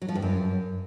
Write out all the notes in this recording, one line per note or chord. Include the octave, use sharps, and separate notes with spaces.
F#3
F3
G2
F#2